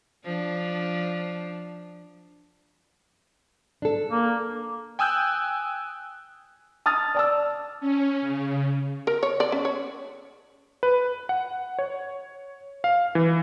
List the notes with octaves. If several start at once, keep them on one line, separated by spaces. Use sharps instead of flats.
F3 D4
D4 A4
A#3
G5 G#5 D#6 E6 F#6 G6
A5 D#6 F6 A6
D5 A5 E6
C#4
C#3
A#4
C#5
D5
C#4
C#5
B4
F#5
C#5
F5
E3